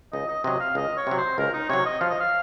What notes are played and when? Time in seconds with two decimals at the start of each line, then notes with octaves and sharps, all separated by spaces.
0.13 C#2 D#5
0.28 D#5
0.44 C3 F#3 D#5
0.60 F5
0.75 C#2 D#5
0.97 C#5
1.07 C3 F#3
1.17 C5
1.38 C#2 A#4
1.53 D#4
1.69 C3 F#3 C#5
1.86 D#5
2.00 F3 F5
2.10 D#5
2.20 F5